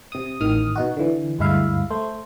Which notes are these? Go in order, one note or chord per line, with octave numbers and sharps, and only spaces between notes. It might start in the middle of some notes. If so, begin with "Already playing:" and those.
C3 D#6
A1 D#3 D#6 F6
B2 D#4 F#4
D3 E3
D2 G2 G#3 E4 E5 F5
A3 C5